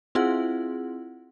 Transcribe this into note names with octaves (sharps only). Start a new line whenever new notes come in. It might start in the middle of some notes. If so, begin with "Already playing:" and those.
C4 E4 F4 G#4 F#5